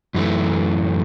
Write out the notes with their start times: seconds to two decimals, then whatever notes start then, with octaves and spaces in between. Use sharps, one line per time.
0.14 F#2 E3 A3